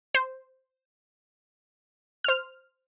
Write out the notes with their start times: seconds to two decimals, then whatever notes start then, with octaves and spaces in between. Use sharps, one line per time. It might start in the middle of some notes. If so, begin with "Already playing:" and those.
0.15 C5
2.24 C5 F6